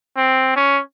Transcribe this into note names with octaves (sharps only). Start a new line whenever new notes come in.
C4
C#4